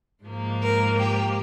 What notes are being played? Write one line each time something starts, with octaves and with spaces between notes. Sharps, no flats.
G#2 F3 A#3
A#4
G4